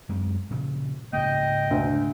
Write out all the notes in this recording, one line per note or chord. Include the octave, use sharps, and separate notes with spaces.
F#2 G#3 C4
A#2 C#3 F3
G#2 C#3 A#3 D#5 G5
D2